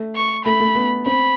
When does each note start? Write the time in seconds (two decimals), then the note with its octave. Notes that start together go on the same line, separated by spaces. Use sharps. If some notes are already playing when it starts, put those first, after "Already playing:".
Already playing: A3
0.16 C#6
0.45 A3 B5
0.60 A3
0.75 B3
1.06 C4 B5